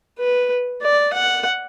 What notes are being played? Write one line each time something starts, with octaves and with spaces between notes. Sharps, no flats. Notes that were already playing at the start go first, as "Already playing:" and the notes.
B4
D5
F#5